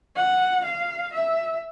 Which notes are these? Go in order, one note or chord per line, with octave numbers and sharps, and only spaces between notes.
F#5
F5
E5